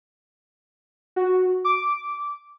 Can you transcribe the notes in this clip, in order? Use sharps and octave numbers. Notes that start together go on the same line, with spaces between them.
F#4
D6